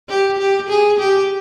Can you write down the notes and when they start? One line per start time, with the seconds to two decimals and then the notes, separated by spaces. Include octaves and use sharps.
0.09 G4
0.38 G4
0.69 G#4
0.99 G4